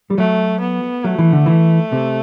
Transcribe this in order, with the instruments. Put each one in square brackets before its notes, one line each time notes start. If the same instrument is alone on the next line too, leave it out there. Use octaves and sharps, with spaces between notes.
[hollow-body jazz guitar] G3
[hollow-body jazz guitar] F#3 [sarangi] A3
[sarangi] B3
[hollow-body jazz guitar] F#3 [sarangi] A3
[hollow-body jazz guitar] E3
D3
E3
C3